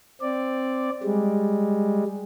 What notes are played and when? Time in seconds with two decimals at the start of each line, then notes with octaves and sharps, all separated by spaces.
0.21 C4 D5
1.03 G3 G#3